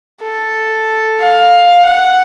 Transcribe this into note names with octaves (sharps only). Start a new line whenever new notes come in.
A4
F5
F#5